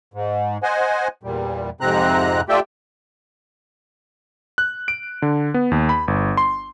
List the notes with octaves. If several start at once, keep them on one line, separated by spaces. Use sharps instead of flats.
G#2
C5 D#5 F#5 G#5
E2 A#2 G3
F2 G#2 C3 C4 A#5 F#6
A3 F4 G4 D5 E5 G5
F#6
D7
D3
B3
D#2
B5
G1
C6